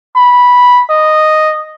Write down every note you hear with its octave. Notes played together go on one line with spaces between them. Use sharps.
B5
D#5